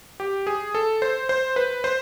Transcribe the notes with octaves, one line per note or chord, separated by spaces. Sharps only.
G4
G#4
A4
C5
C5
B4
C5